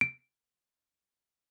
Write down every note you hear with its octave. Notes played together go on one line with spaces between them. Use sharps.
D7